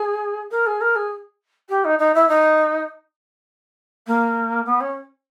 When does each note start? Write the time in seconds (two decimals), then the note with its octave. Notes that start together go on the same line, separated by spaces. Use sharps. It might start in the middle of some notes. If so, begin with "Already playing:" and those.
Already playing: G#4
0.51 A#4
0.66 G#4
0.81 A#4
0.95 G#4
1.69 G4
1.84 D#4
1.99 D#4
2.14 E4
2.28 D#4
4.07 A#3
4.65 B3
4.80 C#4